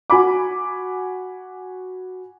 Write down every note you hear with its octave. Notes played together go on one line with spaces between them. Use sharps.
F#4 G#5 B5 D6